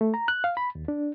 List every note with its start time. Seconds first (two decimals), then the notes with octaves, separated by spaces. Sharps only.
0.01 A3
0.14 A#5
0.28 F#6
0.44 F5
0.57 B5
0.75 D#2
0.88 D4